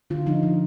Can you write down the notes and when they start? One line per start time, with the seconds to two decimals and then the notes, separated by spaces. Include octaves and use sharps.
0.10 D3 F4
0.26 F3 D#4
0.43 F3